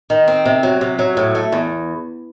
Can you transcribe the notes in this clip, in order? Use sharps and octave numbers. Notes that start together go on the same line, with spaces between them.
D#3
C4
C3
F#3
C3
F#3
A2
A3
E2